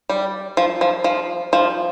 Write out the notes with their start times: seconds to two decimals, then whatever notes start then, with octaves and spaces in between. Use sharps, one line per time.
0.09 G3
0.57 F3
0.81 F3
1.04 F3
1.53 F3